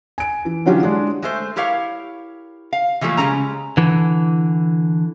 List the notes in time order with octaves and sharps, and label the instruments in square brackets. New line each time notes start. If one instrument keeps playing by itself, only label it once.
[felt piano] G#5 D7
E3
D3 E3 F#3 C#4 F4 G4
G#3 D4 G#4
[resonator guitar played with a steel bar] G#3 A3 C5
E4 G4 A#4 C#5 F5
F5
E3 F3 G3 A3 A#3
C#3 G#3 C#4 A#5
[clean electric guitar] D3 E3